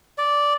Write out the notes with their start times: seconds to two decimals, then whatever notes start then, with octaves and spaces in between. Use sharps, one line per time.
0.18 D5